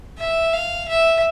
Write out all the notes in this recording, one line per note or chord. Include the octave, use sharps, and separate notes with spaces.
E5
F5
E5